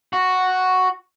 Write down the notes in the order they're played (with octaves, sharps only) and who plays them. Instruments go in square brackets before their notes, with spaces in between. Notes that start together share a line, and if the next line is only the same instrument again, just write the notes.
[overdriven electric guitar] F#4